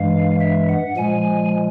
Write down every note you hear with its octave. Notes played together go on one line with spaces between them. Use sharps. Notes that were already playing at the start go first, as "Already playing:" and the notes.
Already playing: G2 E3 G#3 F5
E5
F#5
A#2 F3 G#3 G#5